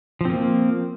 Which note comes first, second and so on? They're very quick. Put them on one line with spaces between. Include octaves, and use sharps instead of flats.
F3 C4 A#3